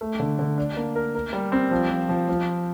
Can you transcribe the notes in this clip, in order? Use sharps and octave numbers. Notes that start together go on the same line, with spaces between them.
A3
D3
D3
D4
A#3
A#4
A#4
G3
C4
F3
F3
F3
F3